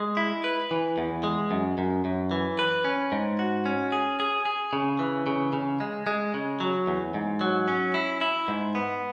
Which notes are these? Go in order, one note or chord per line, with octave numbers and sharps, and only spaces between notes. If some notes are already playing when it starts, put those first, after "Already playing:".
Already playing: G#3
E4
B4
E3
E2
G#3
F#2
F#2
F#2
E3
B4
C#4
G#2
F#4
C#4
G#4
G#4
G#4
C#3
E3
C#3
C#3
G#3
G#3
C#3
F#3
E2
G#2
F#3
C#4
E4
E4
G#2
B3